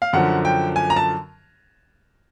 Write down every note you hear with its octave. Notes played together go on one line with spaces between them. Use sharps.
F5
F#2 D3 F3 F#5
G5
G#5
A#5
A5